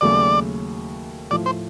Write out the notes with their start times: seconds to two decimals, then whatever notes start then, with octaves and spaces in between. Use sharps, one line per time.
0.01 D#2 C#3 F#3 A3 D5
1.30 A2 F3 A3 D5
1.46 C5